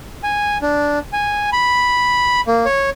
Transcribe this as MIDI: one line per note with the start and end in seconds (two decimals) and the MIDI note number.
0.23 0.58 80
0.62 0.99 62
1.13 1.50 80
1.53 2.41 83
2.47 2.65 58
2.65 2.90 73